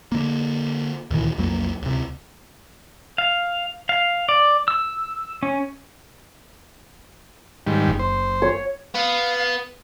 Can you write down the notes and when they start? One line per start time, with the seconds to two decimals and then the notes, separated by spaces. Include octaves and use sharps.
0.12 D3 A#3
1.11 D2 A#2 D#3 E3
1.37 B1 F2 F#3 A#3
1.82 D2 C3
3.18 F5
3.89 F5
4.29 D5
4.68 E6
5.43 C#4
7.66 G#2 D#3 G3
7.86 F#1 F#3
7.99 C5
8.42 C#5
8.94 B3 F5